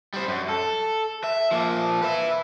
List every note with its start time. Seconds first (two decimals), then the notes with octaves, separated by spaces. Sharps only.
0.14 G3 C5
0.28 F#2
0.49 A4
1.24 E5
1.51 F3 A#3
2.02 B4 E5